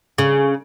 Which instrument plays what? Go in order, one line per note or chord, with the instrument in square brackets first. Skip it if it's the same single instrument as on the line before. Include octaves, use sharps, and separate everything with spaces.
[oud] C#3